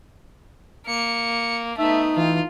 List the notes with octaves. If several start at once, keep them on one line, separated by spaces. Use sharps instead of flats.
A#3 C#7
A3 B3 D#4 E5
E3 F4